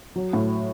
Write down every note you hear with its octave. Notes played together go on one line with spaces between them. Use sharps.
F#3
A2